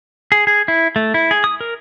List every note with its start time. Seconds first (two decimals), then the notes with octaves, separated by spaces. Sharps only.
0.32 G#4
0.47 G#4
0.68 E4
0.96 A3
1.14 E4
1.31 G#4
1.44 D#6
1.61 A#4